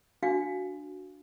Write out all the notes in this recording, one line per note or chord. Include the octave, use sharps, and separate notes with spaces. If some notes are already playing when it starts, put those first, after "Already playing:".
D4 F#4 F5 G5